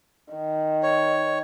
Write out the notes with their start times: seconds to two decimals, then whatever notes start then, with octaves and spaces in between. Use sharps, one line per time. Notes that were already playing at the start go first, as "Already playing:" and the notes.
0.33 D#3
0.83 C#5